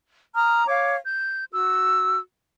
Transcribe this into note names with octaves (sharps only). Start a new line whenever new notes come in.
A#5 D#6 F6
C#5 F5 D6
G6
F#4 E6